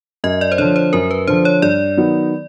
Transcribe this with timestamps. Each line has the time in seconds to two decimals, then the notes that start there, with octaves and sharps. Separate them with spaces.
0.24 F#2 D#5
0.41 D5
0.52 C5
0.58 D3 F3 C#5
0.76 C5
0.93 F#2 A#4
1.11 B4
1.27 D3 F3 C5
1.45 C#5
1.62 G2 D5
1.97 D#3 F#3 B3 D#4